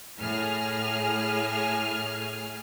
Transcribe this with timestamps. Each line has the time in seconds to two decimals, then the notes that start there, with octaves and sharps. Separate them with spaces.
0.19 A2 G#4 F6